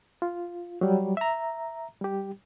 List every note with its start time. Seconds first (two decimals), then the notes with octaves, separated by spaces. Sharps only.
0.22 F4
0.81 F#3 G3
1.17 E5 A#5
2.01 G3 G4